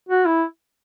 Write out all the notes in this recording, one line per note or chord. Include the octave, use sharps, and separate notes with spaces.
F#4
E4